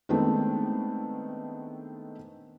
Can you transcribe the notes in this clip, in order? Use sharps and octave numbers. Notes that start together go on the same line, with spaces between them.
D#3 G#3 A3 B3 C4 D4